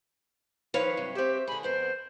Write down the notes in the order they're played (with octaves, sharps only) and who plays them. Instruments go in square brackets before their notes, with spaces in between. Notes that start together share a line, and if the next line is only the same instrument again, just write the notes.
[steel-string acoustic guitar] D#3 F3 [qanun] B4 C#5 F5
[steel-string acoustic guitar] G2 C3 F#3
[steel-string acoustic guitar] C4 E5 [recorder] G4
[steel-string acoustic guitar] D3 G#4 [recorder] B5
[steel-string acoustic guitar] F2 B3 A#4 [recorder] C5